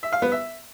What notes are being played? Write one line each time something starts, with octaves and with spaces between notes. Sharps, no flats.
E5
F5
B3
E5